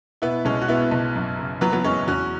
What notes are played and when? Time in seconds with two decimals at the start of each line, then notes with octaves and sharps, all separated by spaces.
0.22 B2 B3 E4
0.45 B1 G#3 C#4
0.61 F#4
0.68 B2 B3 E4
0.91 B1
1.16 F#2
1.39 C#3
1.61 E3 F#3 B3
1.73 F#3 B3
1.84 F#1 G#3 C#4
2.07 E2 C#4 F#4